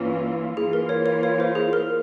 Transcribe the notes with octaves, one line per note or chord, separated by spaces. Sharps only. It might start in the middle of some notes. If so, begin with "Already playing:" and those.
Already playing: G2 E3 A#3 C#4 F4
E3 A#3 F4 G#4
A#4
C#5
C#5
C#5
C5
G#4
A#4